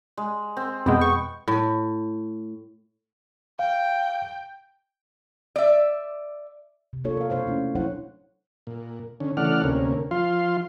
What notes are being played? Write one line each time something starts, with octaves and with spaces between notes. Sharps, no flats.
G#3
C4
F2 B2 G#3 B3 G5
C#6
A2
F5 G5
D5 E5
C3
A#3 D4 F4 A4 C#5
A#4 F5
B2 D4 C5 C#5 F5
A3 C#4 D4 E4
F#3 D4 E4 C5 C#5 F#5
A#2
D3 C#4
C#3 E3 A3 D5 F#5 F6
D2 C3 A#3 C#4
F3 F4 F5 C6